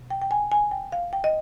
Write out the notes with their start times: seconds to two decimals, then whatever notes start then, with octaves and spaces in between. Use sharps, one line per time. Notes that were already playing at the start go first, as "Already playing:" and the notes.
Already playing: B2
0.10 G5
0.22 G5
0.31 G#5
0.52 G#5
0.71 G5
0.92 F5
1.13 G5
1.24 D#5